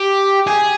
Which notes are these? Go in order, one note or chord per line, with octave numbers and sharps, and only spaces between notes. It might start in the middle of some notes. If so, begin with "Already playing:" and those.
Already playing: G4
G#4